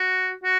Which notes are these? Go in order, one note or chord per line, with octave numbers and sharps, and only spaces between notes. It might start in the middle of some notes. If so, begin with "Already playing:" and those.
Already playing: F#4
F#4